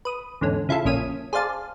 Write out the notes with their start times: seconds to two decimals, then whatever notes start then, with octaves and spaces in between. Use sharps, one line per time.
0.05 B4 D#6
0.41 E2 G#2 D3 C#4
0.69 C#3 E4 F4 A4
0.85 A#1 A#3 C#4 D#6 B6 D#7
1.33 G#4 C5 D5 F5 A5